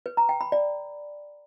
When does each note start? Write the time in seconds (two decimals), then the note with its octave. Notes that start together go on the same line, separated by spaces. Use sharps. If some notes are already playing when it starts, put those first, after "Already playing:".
0.06 B4
0.17 A#5
0.29 G5
0.41 B5
0.52 D5